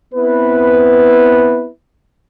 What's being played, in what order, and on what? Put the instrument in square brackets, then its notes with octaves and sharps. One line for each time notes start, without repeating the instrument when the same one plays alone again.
[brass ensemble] B3 C4 E4 B4